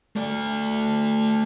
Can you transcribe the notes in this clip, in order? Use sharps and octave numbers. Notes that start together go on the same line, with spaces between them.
A3 D5